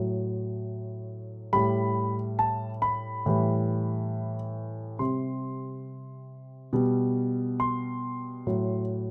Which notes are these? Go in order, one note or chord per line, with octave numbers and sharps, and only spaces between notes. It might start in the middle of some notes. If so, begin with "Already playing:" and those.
Already playing: A2 F#3
A2 G3 B5
A5
B5
A2 E3 G3
C3 G3 C6
B2 G3
C6
A2 F#3